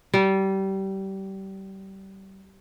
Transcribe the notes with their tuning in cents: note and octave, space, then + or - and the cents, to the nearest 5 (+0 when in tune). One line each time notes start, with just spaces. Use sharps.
G3 -25